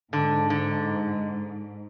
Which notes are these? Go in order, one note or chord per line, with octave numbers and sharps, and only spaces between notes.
G#2 D3
D3